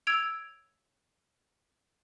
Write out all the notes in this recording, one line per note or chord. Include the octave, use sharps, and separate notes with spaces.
E6 G#6 D7 F7